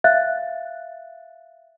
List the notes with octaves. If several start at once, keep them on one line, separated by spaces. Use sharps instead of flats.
E5 F5 F#6 A6